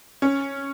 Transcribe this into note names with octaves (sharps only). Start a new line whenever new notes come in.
C#4